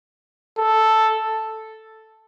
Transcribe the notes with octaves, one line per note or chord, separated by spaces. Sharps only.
A4